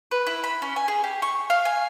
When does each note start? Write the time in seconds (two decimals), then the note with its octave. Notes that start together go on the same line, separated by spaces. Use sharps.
0.11 B4
0.27 E4
0.44 B5
0.62 C#4
0.76 G#5
0.88 G#4
1.04 G4
1.22 C#6
1.50 F5
1.65 G#5